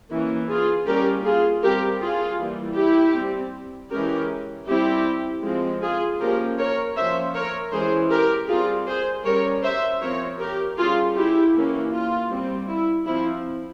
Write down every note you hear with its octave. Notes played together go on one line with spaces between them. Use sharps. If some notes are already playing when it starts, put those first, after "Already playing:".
E3 A#3 C#4
F4 G#4
G3 A#3 C#4 G4 A#4
F4 G#4
G3 C4 G4 A#4
F4 G#4
E3 G3 A#3
E4 G4
G3 C4
E3 G#3 C#4 G4 A#4
G3 C4 E4 G4
F3 G#3 C4
F4 G#4
F3 A#3 C#4 G4 A#4
A#4 C#5
F3 A#3 C#4 C5 E5
A#4 C#5
E3 G#3 C#4 G#4 C5
G4 A#4
G3 C4 F4 G#4
G#4 C5
G3 C#4 A#4 C#5
C5 E5
F3 C4 A#4 C#5
G4 A#4
G3 C#4 F4 G#4
E4 G4
E3 A#3 C#4
F4
G3 C4
E4
F3 C4 E4